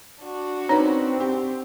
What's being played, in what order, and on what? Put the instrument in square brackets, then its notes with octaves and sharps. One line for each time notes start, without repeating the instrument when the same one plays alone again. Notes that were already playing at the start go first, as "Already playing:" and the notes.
[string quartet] D4 F#4
[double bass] C4 [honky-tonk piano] C#4 B4 [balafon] D#4
[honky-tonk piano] G4